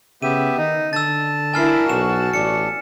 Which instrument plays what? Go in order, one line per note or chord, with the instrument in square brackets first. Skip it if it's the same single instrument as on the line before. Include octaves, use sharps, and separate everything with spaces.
[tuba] C#3 [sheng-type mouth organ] B3 G4 E5 [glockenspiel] D#7
[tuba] D#3 [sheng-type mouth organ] D#4
[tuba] D3 [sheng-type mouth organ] A5 [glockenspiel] E6 A6
[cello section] D4 E4 A#4 [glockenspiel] G#5 F6 C7
[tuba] B1 [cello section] F#4 [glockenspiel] E7
[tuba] A1 [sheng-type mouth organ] D4 [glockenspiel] C#7